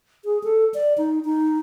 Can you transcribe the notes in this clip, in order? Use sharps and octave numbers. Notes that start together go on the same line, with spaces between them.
G#4
A4
D5
D#4
D#4